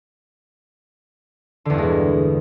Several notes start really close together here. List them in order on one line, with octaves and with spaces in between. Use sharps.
D3 E2 G2 G#3 B2